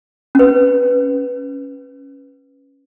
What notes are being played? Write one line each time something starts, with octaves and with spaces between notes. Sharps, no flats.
C#4 B4